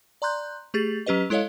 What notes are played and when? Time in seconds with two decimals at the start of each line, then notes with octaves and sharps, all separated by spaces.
0.22 D5 A#5 C6 F#6 G6
0.74 A3 G4 G#4 A6
1.06 F#3 C#4 G4 B4 D#5
1.30 G#3 E4 A4 C#5 D#5 F5